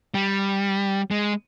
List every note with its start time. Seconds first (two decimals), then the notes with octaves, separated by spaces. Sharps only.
0.14 G3
1.11 G#3